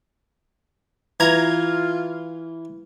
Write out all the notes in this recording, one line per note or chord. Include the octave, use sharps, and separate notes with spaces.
E3 F4 A#5 G#6